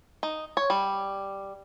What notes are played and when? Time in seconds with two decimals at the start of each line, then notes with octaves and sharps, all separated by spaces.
0.23 D#4
0.57 C#5
0.70 G3